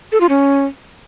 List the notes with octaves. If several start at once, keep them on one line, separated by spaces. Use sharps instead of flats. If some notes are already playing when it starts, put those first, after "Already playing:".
A4
F4
C#4